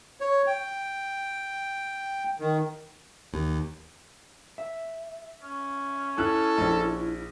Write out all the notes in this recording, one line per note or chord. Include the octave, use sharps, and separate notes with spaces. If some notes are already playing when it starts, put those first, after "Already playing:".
C#5
G5
D#3
D#2
E5
C#4
E4 A4 F#6
A#1